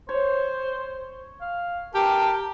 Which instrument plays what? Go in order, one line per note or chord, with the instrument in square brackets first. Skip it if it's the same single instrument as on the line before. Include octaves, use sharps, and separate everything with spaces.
[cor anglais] C5 [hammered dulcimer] C#5
[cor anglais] F5
[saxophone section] G4 [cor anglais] A#4 [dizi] A5